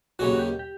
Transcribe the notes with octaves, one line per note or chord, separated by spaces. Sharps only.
D#2 C#3 F#3 F#4
F#4
G4
G4